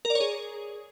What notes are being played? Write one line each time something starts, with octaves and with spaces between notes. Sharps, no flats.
A#4
D5
C#5
G#4